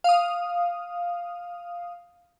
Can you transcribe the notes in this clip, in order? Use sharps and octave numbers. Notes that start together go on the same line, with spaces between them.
F5 D#6